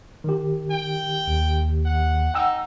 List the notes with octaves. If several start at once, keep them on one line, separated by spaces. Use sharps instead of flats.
D#3 G4
G5
D#2
F#5
D#4 F#5 G5 E6